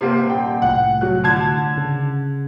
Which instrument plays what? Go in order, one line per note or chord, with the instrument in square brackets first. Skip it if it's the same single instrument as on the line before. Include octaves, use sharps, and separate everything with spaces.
[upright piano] C3 A#3 C4
D#1 G5
[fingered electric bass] C2 A2 [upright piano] F#5
[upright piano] F#3 F#6
D3 A5 G#6
[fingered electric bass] C#3